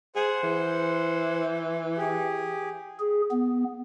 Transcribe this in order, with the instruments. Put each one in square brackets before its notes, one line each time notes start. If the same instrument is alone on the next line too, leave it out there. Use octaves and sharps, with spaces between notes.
[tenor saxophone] G#4 [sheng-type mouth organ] C5 F#5
[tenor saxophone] E3
[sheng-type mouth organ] G4 G#4
[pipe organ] G#4
B3